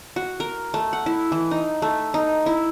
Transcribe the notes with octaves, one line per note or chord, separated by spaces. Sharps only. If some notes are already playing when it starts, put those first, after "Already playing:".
F#4
A#4
A3
F#5
E4
E3
D#4
A3
D#4
E4